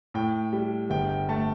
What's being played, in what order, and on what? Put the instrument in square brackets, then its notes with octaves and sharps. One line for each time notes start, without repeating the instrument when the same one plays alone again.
[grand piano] A2 G5
G3
G1 G5
G5
A3 A5